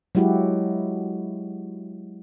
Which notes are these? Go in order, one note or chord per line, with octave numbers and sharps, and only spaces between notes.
F#3 G#3 E4 F#4 G4